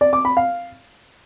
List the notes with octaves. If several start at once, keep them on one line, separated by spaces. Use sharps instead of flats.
D5
D6
B5
F5